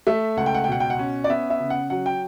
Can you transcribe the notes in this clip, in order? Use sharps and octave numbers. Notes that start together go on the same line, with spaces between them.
A3 E5
C#2 F#5
G5
F#5
G5
B2 F#5
G5
F#5
C#4
D5
B3 E5
E5
C#3
F#5
F#3 F#5
G5